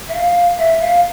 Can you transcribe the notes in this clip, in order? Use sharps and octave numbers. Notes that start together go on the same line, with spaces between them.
E5
F5
E5
F5